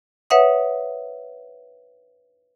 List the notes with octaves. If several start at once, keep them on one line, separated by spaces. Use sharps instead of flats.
B4 C#5 E5 F#5 D#6